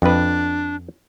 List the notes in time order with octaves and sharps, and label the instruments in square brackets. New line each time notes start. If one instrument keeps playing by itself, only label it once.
[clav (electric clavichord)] F2 B4 [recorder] D4